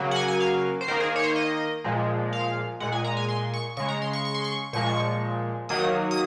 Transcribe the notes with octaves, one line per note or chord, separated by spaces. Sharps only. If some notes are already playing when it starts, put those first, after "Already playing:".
Already playing: C#3 F#3 A#3
F#5
G#5
G#5
F5
C5
D#3 A#3 A#4
G#4
C#5
C5
D#5
A#2 F3 G#3
F5
A#2 G#3 F#5
G#5
A#5
G#5
C6
C#6
C#3 G#3 C#6
A#5
C6
C#6
C#6
C6
C#6
A#2 F3 G#3 C#6
D#3 F#3 A#3 D#6
D#6